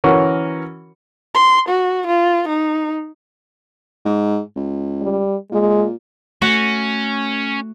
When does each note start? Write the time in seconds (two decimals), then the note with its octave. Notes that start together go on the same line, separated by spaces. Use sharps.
0.04 E3 C#4 F#4 A#4
1.34 C6
1.68 F#4
2.07 F4
2.48 D#4
4.05 G#2
4.56 C#2
5.02 G3
5.52 A#2 G#3
6.42 A3 C#4 F#4